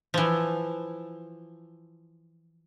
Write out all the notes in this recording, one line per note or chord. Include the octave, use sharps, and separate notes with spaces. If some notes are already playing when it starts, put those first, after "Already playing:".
E3 F3